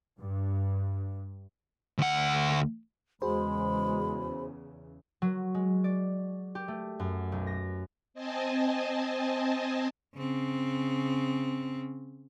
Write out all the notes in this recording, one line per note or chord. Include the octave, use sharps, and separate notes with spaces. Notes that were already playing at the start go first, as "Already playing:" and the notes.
G2
D2 F#5
E2 C#3 G#3 F#4 G#4 C5 B5
F#3
G#3
D5
G4
A3
F#2
B1
A#6
C4 D#5 G#5 A5
C#3 C4